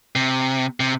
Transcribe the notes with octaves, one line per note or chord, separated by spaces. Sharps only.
C3
C3